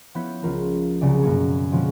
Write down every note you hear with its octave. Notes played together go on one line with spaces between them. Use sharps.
F3 B3 E4 C#5 G6 B6
C#2 F3 F4 A#4
C2 C#3 F#3 D5
F#2 B2 A#3 C#5
B2 D3 F3 F#3 G#3